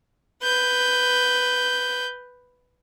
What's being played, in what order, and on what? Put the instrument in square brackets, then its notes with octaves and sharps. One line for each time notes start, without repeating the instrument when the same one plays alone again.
[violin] B4 G6